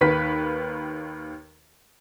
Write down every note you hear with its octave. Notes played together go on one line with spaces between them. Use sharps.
D#2 D#3 B4 B6